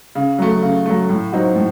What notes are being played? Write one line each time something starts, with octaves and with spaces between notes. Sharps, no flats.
C#3
F#3 A3
C#3
F#3 A3
A2
F#3 C4 D#4 F#4
A2